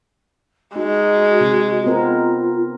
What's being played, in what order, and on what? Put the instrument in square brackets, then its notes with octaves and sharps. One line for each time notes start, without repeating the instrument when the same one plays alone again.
[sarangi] G#3 [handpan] D#4 [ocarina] F#4 [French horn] D#5
[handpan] C3 [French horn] D#5
[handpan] B3 C4 A#4 [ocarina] F4